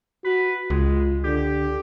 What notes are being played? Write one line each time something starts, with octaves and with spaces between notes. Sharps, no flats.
F#4 B4
C#2 G#3 F4
D3 G4